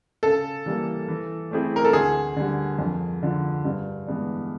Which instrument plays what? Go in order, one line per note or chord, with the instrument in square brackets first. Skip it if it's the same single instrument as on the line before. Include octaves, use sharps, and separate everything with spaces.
[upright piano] C#3 [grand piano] A4
[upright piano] E3 G3 A#3
E3
A3 C4 E4 G#4
[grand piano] A#4
A4
[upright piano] D2 [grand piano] G#4
[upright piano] D3 G3
F2
D3 F3
G2
E3 G#3 B3 D4